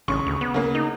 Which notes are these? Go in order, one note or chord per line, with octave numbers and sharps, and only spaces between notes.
A1 C#3 C#6
D2
B3
C#3 A#3
D#4